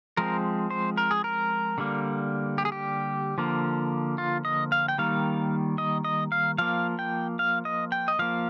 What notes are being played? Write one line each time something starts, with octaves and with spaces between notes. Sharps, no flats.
F3 G#3 C4 A#4
C5
A#4
G#4
A#4
D3 G3 A#3
G4
G#4
G4
D3 F3 A#3
F4
D#5
F5
G5
D#3 G3 A#3 F5
D#5
D#5
F5
F3 A#3 F5
G5
F5
D#5
G5
D#5
F3 A#3 F5